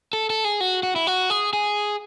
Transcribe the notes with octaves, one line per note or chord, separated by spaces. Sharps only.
A4
A4
G#4
F#4
F#4
E4
F#4
G#4
G#4